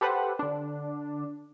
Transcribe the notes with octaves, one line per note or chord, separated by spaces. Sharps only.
G4 A4 B4 C5 F#5
D3 D4